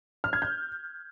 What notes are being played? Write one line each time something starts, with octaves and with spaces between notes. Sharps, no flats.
F6
G#6
G6